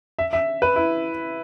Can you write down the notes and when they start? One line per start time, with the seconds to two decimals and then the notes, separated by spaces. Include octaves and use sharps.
0.19 E5
0.33 E5
0.62 B4
0.76 E4